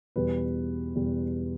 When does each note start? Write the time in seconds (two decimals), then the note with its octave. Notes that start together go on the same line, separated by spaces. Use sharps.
0.16 E2 B2 G3 B4
0.95 E2 B2 G3